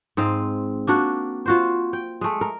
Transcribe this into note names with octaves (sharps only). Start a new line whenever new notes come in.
G#2 C4 D#5 F5
A#3 D4 F#4
F4 F#4 C5
G5
G#3 A3
A#4